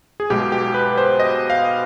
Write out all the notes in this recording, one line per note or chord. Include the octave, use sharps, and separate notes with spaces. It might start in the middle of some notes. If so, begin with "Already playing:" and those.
G#4
B1 B2 G#3 G4
G4
B4
C5
D#5
F5